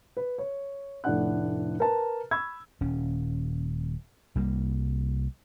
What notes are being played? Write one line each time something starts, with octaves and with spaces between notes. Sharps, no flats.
B4
C#5
F1 A2 D4 F#5 F#6
A#4 B4 A5
B5 C#6 E6 G#6
D#1 C#4
C2 G3 A#3